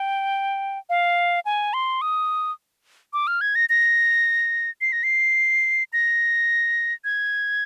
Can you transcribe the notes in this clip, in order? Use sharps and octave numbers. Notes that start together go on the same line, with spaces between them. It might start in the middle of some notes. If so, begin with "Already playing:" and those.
Already playing: G5
F5
G#5
C6
D#6
D6
F6
G#6
A#6
A#6
C7
A#6
C7
A#6
G#6